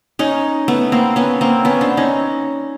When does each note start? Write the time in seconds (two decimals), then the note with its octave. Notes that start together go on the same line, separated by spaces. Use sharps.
0.19 C#4 D#4
0.68 A3 B3
0.92 A#3 C4
1.16 B3 C#4
1.41 A#3 C4
1.65 B3 C#4
1.81 C4 D4
1.97 C#4 D#4